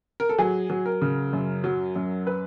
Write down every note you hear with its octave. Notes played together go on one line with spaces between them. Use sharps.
A#4
A4
F#3 G#4
F#3
A#4
C#3
F#2
F#3
F#2
B4